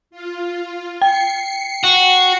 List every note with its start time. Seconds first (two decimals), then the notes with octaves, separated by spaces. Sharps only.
0.11 F4
1.02 G5 C7 C#7
1.84 F#4